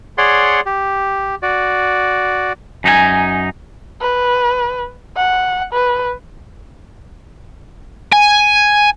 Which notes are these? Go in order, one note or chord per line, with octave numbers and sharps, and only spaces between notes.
G#4 C#5 D5 F#5 C6
G4
F#4 D5
F#2 D#4 G4 G#5
B4
F#5
B4
G#5